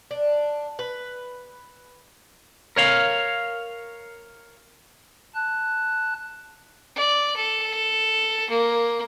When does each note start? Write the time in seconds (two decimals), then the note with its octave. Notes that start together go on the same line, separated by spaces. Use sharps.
0.11 D4
0.79 B4
2.76 A#4 C#5 F5
5.35 A5 F#6
6.96 D5
7.36 A4
8.50 A#3